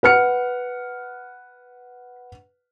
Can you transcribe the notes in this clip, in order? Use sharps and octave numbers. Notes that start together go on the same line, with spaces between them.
B4 F#5 F6 C#7